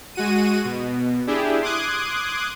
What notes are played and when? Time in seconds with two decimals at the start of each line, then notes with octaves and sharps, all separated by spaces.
0.15 G#3 F#4 D#7
0.65 B2
1.27 D4 E4 G4 G#4
1.62 C6 D6 D#6 F#6 G#6